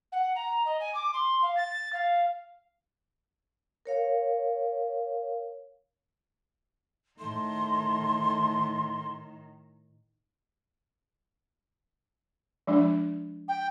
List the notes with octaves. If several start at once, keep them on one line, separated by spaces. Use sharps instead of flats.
F#5
A#5
D#5
G#5
D6
C6
F5
A6
F5
A#4 C#5 F5
A2 D#3 A3 C6
F3 G#3 D4
G5